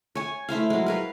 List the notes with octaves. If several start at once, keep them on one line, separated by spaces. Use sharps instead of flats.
C#5 G#5
A3 E4 C5 F5
F#3 G#3
A#4 B4 F5